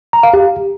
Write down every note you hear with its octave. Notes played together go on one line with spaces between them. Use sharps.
A#5
F5
G4